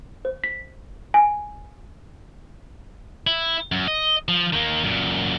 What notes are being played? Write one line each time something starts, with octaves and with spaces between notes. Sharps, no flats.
C5
B6
G#5
E4
F#2
D#5
F3
D#3 A#3
F#2 A#2